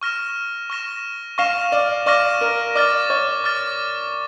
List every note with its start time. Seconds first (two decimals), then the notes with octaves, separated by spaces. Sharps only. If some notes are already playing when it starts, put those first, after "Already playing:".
0.01 C#6 F6 A#6 E7
0.70 C#6 F6 A#6 E7
1.38 F5 C#6 F6 A#6 E7
1.72 D5
2.06 D5 C#6 F6 A#6 E7
2.41 A#4
2.75 D5 D6 F6 A6
3.10 C#5
3.44 D6 F6 A6